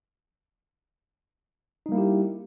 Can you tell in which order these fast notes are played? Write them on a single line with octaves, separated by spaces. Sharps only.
D#4 G3 A#3 E4 G4